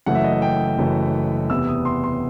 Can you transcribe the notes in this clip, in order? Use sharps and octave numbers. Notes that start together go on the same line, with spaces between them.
F#1 F#2 E3 A3 F#5
E5
D#5
E5
G5
F#1 F#2 E3 A3
E2 C3 E3 B3 E6
D#6
C6
C6